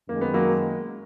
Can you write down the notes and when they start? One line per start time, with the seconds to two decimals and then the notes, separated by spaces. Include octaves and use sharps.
0.09 F#2 D#3 G#3 A#3
0.21 B3
0.34 F#3 A#3